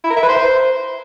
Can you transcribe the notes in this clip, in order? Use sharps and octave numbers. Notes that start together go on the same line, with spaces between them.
E4
A#4
E5
B4
C5